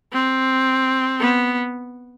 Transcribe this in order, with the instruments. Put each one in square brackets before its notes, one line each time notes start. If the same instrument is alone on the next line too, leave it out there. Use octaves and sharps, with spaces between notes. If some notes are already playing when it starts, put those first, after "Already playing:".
[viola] C4
B3